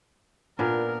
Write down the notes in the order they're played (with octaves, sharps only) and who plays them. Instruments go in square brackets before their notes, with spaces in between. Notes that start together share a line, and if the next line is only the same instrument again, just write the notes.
[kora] A#2 B3 D4 [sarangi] A#4